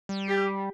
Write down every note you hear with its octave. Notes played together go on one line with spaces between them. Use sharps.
G3
G4